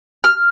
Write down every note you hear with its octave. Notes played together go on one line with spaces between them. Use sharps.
F6